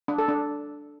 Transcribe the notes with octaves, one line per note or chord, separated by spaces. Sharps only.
D4
A4
D4